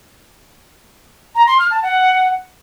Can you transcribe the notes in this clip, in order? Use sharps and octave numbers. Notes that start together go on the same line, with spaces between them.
A#5
C6
F6
A5
F#5